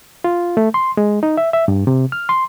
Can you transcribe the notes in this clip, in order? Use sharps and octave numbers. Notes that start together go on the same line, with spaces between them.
F4
A3
C6
G#3
D#4
E5
E5
G2
C3
F6
C6